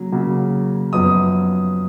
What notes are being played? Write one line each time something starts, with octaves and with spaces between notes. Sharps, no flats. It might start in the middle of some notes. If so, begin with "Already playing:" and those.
Already playing: C#3 F#3 A#3
C#3 F#3 A#3
F#2 F3 B3 D#6